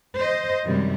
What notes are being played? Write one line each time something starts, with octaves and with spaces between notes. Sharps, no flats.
C5 D#5
F#2 C3 D#3 G3 G#3